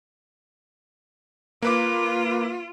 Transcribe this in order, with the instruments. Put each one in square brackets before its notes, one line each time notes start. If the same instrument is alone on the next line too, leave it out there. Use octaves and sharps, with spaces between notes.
[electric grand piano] A#3 B4 D6 [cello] F4